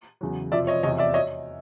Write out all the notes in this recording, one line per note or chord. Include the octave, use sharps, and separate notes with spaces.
E2 C#3 F#3
F2 C3 F3 D5 E5
C#5 D#5
E2 C3 F3 C#5 D#5
D5 E5
C#5 D#5